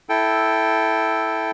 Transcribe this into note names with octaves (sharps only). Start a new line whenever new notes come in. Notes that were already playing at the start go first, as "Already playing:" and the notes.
E4 A4 G5